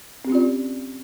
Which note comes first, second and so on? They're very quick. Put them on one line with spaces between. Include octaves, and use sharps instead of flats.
C4 G4 C#4 F4 D5